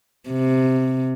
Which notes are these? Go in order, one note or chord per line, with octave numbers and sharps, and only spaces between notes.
C3